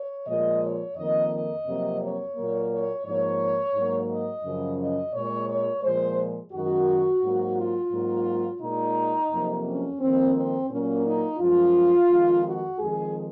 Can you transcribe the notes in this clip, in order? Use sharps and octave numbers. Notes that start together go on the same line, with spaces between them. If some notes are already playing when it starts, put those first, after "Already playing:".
Already playing: C#5
A#2 F3 G#3 D#5
C#5
F2 D#3 A#3 D#5
D#5
F2 C3 F#3 A#3
C#5
A#2 F#3 A#3
C#5
G#2 F3 A#3 C#5
G#2 F#3 A#3
D#5
F#2 C#3 F3
D#5
A#2 G#3 C#5
C#5
A#2 F3 G#3 C5
F#2 D#3 G#3 F#4
G#2 F#3 A#3
F4
G#2 F#3 A#3
A#2 G#3 D#4
F2 C3 F#3 A#3
C#4
F2 D#3 A#3 C4
C4
A#2 F#3 A#3 C#4
D#4
F#2 F3 G#3 F4
F2 D#3 G#3
F#4
F2 D#3 G#3 G#4